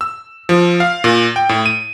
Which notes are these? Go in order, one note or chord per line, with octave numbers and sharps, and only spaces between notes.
E6
F3
F5
A#2
G5
A2
D#7